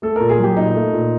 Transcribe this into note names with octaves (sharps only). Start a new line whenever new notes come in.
A3 A4
A#2 A#4
G#4
F#3 G4
A#2 D#4
A3
A#2